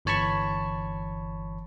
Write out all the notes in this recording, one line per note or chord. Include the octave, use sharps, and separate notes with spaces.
G1 E3 C#5 A5 B5 C#6